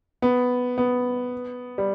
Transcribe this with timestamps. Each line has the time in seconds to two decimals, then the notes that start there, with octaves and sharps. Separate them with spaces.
0.22 B3
0.78 B3
1.78 G3